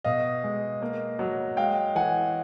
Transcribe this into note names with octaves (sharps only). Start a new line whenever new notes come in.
B2 D#5 F5
G#3
A#3
F#3
G#3 F5 G5
E3 F#5 G#5